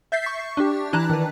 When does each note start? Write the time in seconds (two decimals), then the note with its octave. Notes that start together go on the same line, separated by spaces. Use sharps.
0.12 E5 G6 A6 B6 C7
0.26 C#6
0.57 D4 G4
0.93 E3 D4 E4 A5 A#5 F#6
1.10 D#3 B4